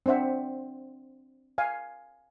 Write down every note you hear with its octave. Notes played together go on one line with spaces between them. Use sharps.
C4 D4 C5 E5 F#5
F5 G#5